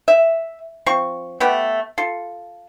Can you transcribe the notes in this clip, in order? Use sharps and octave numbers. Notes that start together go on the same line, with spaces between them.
E5
F3 C4 C#6
A3 B3 G4
F4 A4